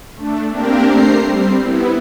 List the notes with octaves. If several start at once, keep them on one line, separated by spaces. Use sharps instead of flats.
A3 D4
A#3 C4 D4 G4 A#4
A3 C5 A#5 C7
G3 C4
B3 E4